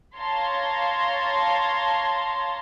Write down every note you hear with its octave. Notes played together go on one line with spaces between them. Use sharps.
C#5 F5 A5 A#5 C6